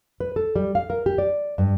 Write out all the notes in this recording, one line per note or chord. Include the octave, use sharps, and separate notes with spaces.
B4
A4
G3
F5
A#4
G4
D5
G2